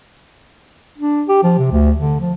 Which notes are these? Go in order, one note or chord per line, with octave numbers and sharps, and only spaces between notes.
D4
G4
F3
C3
D2
D3
F3